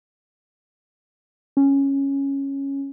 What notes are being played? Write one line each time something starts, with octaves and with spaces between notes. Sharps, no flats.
C#4